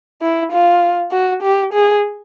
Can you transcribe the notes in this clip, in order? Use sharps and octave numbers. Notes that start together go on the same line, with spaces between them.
E4
F4
F#4
G4
G#4